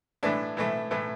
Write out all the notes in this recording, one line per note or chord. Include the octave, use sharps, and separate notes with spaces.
A2 E3 A3 D4
A2 E3 A3
A2 E3 A3